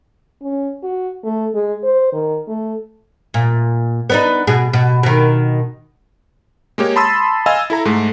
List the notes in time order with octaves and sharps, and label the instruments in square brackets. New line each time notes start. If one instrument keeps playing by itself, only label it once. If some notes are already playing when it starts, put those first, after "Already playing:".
[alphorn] C#4
F#4
A3
G#3
C5
D#3
A3
[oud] A#2
B3 D4 D#4
B2 G#4
B2
B2 D#3
[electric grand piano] G#3 A#3 G4 C#5
A5 B5 C6 D#6 E6 A6
D#5 F5 G#5 E6
E4 A4 A#5
G#2 G#3 A3